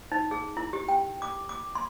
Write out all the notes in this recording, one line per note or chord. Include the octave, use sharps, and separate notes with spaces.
D#4
G#4
E4
G4
G5
D6
D6
C6